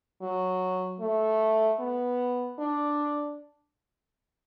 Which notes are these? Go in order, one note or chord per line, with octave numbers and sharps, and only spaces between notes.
F#3
A3
B3
D4